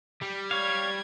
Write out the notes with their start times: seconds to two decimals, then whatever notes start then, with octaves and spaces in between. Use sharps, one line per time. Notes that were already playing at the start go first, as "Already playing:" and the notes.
0.22 G3
0.51 C#5 F5 G#6